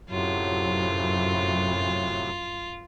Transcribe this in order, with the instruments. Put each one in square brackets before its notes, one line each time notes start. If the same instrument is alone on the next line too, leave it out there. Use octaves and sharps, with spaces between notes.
[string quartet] F#2 [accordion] A2 C3 F#3 [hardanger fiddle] F4